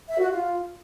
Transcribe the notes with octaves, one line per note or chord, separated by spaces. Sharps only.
E5
F#4
F4